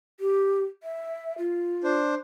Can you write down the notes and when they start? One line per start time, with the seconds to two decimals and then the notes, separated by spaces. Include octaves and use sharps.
0.20 G4
0.83 E5
1.38 F4
1.84 D4 C5